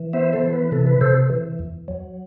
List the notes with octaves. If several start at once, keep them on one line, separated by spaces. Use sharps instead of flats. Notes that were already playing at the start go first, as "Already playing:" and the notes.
Already playing: E3
B3 C5 E5
A4 C5
E3
B4
C3 A4
B4
C3 A4 C5
E3
E2
F#3